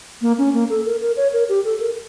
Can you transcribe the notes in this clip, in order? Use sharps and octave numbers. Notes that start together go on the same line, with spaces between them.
A#3
C#4
A#3
A4
A#4
A#4
C#5
A#4
G4
A4
A#4